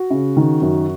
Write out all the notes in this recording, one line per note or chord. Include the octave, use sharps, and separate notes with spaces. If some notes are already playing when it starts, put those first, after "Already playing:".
Already playing: F#4
C#3
D#3
F#2